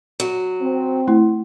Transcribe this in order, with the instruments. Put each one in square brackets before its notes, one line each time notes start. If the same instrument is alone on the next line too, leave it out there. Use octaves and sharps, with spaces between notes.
[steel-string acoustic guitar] F#3
[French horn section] C4
[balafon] A3 E4